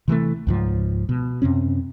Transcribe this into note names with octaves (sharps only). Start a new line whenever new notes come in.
C3 E3 F3 A3
C#2 G#2 F3
B2
F#2 C3 C4 C#4